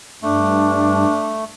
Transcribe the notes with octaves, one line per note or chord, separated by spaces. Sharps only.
G2 A3 D4